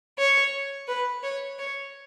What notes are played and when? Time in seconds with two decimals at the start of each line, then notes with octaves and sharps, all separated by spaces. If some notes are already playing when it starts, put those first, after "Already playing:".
0.18 C#5
0.88 B4
1.23 C#5
1.59 C#5